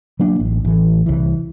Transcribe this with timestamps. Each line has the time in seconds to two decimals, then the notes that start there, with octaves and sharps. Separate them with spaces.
0.19 F#3 A#3 D4
0.40 A1
0.65 A1 E3
1.06 C2 E3